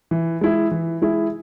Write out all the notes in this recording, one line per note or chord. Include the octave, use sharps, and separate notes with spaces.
E3
G#3 E4 G#4
E3
G#3 E4 G#4